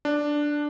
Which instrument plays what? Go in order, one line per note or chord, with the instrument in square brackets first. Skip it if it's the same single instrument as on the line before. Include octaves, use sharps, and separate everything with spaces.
[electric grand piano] D4